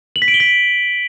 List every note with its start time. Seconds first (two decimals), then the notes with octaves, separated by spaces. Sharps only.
0.16 F#7
0.22 B6
0.28 D7
0.34 G7
0.40 B6